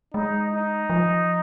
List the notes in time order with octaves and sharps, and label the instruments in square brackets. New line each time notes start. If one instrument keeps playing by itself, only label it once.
[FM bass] G#3 [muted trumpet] D#4
[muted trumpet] D#4
[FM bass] F3